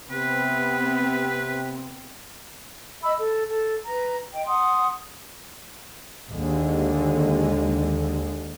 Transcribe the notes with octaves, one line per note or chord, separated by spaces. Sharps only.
C3 B3 C4 B4
D#5 E5 B5 E6
A4
A4
B4 A#5
D#5 G5
F#5 C6 D#6
D#2 D3 G#3